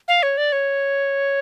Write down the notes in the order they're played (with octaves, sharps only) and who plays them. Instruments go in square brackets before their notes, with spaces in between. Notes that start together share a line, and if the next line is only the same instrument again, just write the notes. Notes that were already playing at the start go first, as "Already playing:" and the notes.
[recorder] F5
C#5
D5
C#5